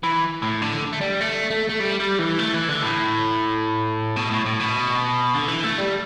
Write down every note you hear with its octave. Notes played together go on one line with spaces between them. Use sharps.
E3
A2
D3
A3
G3
A3
A3
A3
G3
G3
E3
A3
E3
D3
A2
B2
A2
A2
B2
D3
E3
A3
G3